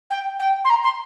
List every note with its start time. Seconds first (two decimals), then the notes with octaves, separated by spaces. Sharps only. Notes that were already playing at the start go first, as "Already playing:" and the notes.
0.10 G5
0.39 G5
0.64 C6
0.69 A#5
0.83 C6